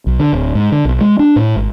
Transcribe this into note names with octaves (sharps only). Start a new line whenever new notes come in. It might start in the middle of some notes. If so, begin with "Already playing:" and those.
B1
D3
D1
G#2
D3
B1
G#3
D4
A2
G#1